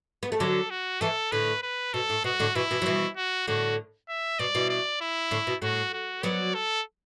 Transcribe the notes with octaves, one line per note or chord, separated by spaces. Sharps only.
B3
A3
D3 F#3 A4
F#4
E3 A3 A4
A2 D3 B4
B4
B2 A4
A2
B2 F#4
A2 D3
B2 E3 E4
B2 E3
F#3
B2 E3
F#4
A2 D3 F#4
E5
B2 D5
B2 E3
D5
E4
A2 D3
B2
A2 F#4
F#4
F#3 B3 D5
A4